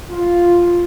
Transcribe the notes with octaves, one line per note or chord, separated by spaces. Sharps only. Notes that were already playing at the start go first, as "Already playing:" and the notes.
F4